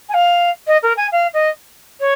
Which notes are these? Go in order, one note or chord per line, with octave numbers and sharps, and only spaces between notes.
G#5
F5
D#5
A#4
G#5
F5
D#5
C#5